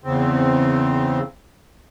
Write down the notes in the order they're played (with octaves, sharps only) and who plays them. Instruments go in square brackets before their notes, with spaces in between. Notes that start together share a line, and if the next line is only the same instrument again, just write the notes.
[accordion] E2 C#3 C4